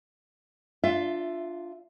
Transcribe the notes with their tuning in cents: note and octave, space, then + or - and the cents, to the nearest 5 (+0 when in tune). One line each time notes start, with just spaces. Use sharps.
D4 +15 F4 +0 E5 +20